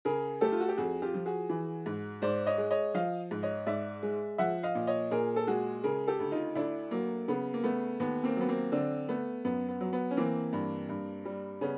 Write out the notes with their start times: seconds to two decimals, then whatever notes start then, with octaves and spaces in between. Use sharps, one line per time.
0.05 C#3 G#4 A#4
0.41 A3 G4 A4
0.52 F4
0.60 F#4
0.69 G4
0.77 F2 F#4 G#4
1.02 F4 G4
1.14 F3
1.26 F#4 G#4
1.50 E3
1.86 G#2
2.22 G#2 C5 D5
2.47 C#5 D#5
2.58 G#3
2.71 C#5 D#5
2.94 F3 D#5 F5
3.31 G#2
3.43 C#5 D#5
3.67 G#2 D5 E5
4.03 G#3
4.38 F3 E5 F#5
4.63 D#5 F5
4.75 A#2
4.87 C#5 D#5
5.11 A#2 G#4 A#4
5.36 A4
5.47 G#3 F#4 G#4
5.84 C#3 G#4 A#4
6.07 G4 A4
6.20 D2
6.31 D#4 F4
6.55 D2 D4 E4
6.91 F#3 A#3
7.28 C#3 B3
7.54 A#3
7.64 A3 B3
8.00 D#2 B3
8.24 A#3 C4
8.37 F#3 B3
8.49 A#3 C4
8.72 D3 C4 D4
9.09 A3 B3
9.45 F#2 B3
9.69 B3
9.81 F#3
9.93 B3
10.11 C#4
10.17 E3 A#3 C4
10.53 G2
10.89 G2
11.25 G3
11.61 C#3 B3 C#4